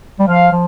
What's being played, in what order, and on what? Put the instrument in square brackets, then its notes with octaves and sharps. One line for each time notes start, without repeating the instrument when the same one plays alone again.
[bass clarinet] G3
[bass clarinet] F3 [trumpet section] F5
[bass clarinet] F3